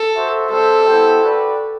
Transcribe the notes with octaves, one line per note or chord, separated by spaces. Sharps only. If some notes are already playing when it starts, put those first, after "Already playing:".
Already playing: A4
F#4 C5 E5
G3 C4 G4 A4 C5 E5
B3 E4 G4 C5 G5
F#4 B4 D5 G5